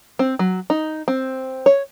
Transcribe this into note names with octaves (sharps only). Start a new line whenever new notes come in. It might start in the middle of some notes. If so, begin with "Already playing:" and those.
C4
F#3
D#4
C4
C#5